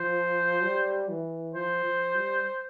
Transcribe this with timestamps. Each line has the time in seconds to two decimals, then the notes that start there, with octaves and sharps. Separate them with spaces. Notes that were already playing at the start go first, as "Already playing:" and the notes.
Already playing: F3 C5
0.63 G3
1.09 E3
1.54 F3 C5
1.85 F3
2.15 G3